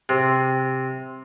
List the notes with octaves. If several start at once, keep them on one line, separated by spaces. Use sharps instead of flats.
C3